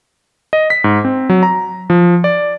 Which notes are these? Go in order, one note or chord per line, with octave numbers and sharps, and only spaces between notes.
D#5
B6
G#2
C4
F#3
A#5
F3
D5